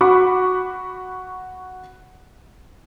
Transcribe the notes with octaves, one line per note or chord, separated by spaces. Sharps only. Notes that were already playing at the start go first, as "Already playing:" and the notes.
F#4 B5 C#6 D6